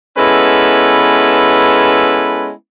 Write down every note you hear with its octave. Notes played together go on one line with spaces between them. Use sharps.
G#3 B3 C#4 E4 A4 B4